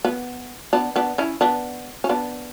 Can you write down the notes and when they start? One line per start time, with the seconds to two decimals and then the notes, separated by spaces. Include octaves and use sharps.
0.05 B3
0.73 B3 D4
0.96 B3 D4
1.18 C#4 E4
1.41 B3 D4
2.04 C#4
2.09 B3 D4